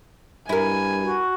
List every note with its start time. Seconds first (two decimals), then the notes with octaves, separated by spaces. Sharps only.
0.49 G2 E4 A#4 G#5
1.03 F#4